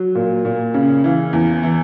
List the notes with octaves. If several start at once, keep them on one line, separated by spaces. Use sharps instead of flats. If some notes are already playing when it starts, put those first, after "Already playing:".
Already playing: F#3
A#2
A#2
C#3
E3
E2
E3